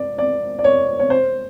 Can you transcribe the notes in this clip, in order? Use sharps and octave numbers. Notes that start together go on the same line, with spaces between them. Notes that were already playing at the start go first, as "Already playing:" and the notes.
Already playing: D5
D5
D5
C#5
C#5
C5